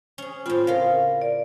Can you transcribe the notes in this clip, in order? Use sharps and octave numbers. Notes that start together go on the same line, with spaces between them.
C#4 G#4
A2 C4 F4 B5
C#3 F4 A#4 F5
D5